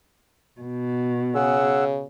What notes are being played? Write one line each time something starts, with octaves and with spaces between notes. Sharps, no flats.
B2
C#3 G#4 F#5 E6